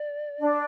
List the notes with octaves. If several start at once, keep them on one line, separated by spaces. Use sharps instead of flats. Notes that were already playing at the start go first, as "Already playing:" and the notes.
Already playing: D5
D4